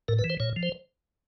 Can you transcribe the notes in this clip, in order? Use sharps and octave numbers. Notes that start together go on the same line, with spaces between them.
A2 A#4
B4
E3
C5
A#2 C#5
F3
C5